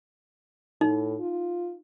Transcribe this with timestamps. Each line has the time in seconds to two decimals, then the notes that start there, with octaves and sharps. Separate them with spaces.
0.81 A2 D#4
1.20 F4